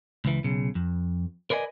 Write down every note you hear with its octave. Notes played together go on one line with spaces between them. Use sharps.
C#2 E3
B1 C#3
F2
A#4 B4 D5 D#5 G#5